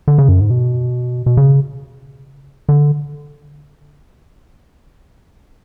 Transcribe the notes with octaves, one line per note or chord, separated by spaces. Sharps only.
D3
C#3
F#2
G#2
B2
B2
C#3
D3